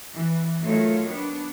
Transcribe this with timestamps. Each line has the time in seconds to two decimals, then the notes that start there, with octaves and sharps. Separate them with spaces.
0.17 E3
0.63 D#3 F#3 A3 F4 C#5
1.08 B3 D4